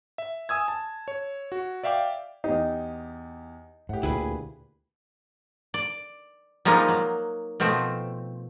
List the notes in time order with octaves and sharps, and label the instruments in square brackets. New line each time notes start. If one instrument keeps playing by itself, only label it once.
[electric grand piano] E5
G#5 D#6 E6 G#6
A5
C#5
F#4
D5 E5 F5 G5 D6
[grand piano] E2 G4 [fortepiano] D#4
[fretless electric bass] A2 [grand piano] G4 F#5
[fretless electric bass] D2 A#2 [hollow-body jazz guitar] E4 G#4 B4
[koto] D5
F3 G3 G#3 A#3 D#4
F#3
B2 F3 A3 C4